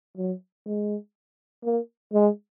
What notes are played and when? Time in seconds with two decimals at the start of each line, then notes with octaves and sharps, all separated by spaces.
0.17 F#3
0.66 G#3
1.64 A#3
2.13 G#3